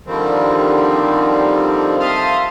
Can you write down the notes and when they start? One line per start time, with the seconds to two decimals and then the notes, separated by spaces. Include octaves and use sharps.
0.06 D3 D#3 F3 G3 C4
2.00 E5 F5 A5 C6 D#6 F6